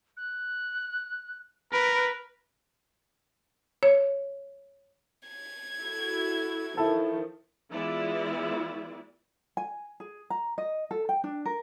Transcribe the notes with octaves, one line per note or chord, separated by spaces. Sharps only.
F#6
A#4 B4 D7
C#5
G#6
E4 F#4 A4
D#3 F3 E4 A4
E3 G#3 B3 E4 F4 D5
G#5
G#4
A#5
D#5
A4
G5
D4
A#4